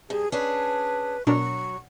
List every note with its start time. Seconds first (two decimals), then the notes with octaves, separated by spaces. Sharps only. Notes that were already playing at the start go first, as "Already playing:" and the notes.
0.10 G2 G#4
0.32 C#4 D4 G#4 B4
1.27 B2 F#3 D4 A#4 C#6